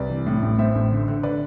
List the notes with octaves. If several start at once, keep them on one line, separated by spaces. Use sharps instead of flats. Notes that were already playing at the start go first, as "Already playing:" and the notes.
Already playing: C2 B4 D5
E3
A2
A1
A2 C5 E5
A1
D3
D3
D3 B4 D5